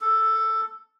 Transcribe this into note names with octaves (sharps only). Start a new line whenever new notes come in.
A4